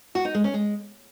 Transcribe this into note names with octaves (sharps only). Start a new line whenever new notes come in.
F#4
D#4
G#3
C#4
G#3